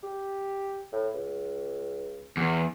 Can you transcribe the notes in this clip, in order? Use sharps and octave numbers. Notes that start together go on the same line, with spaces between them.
G4
A2
C#2
E2